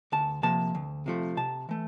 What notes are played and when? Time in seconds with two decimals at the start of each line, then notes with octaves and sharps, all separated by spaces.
0.12 D2 A5
0.43 C3 F3 A#3 A5
0.75 D2
1.06 C3 F3 A3
1.37 C3 A5
1.69 E3 A3